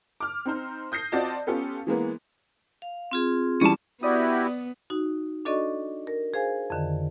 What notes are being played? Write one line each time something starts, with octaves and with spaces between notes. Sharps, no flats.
D6 F6
C4 D#4 C5
D#6 G6 A#6 C7
C4 F4 F#4 D5 D#5 A5
B3 C#4 F4 G4 A4 B4
E3 G#3 A#3 B3
F5
C4 F4 G#4
E3 G3 C#4 A5
B3 E4 F#4 G4 D5 D#6
D#4 F#4
D4 F#4 A4 D5 D#5 C#6
A#4
G#4 C5 F5 G#5
F2 D3 D#3